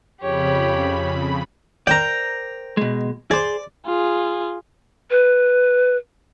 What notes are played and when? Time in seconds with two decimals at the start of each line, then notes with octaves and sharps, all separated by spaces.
0.21 F2 C#3 G4 C#5 B5
1.87 A#4 C5 D5 G5 A#5
2.77 B2 G#3
3.31 G#4 C5 D5
3.86 F4 G#4
5.11 B4